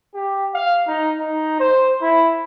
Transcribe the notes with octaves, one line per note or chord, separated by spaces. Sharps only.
G4
F5
D#4
D#4
C5
E4